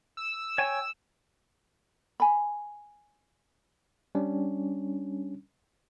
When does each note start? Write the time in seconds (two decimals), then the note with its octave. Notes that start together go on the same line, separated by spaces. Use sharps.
0.17 E6
0.58 C#5 G5 G#5
2.20 G#5 B5
4.15 G3 C#4 D4